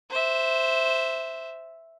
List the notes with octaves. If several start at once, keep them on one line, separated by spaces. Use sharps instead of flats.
C5 E5